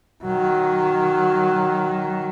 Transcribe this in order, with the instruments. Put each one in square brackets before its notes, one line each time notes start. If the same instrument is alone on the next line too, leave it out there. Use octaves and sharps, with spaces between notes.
[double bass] D#3 F#3